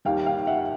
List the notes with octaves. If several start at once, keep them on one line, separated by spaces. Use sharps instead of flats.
D#2 D#3 G3 F5 G5
F5 G5
E5 F#5